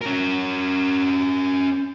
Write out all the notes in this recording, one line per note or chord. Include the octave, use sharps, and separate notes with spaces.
C#4 A#4